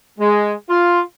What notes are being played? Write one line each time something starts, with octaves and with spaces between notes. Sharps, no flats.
G#3
F4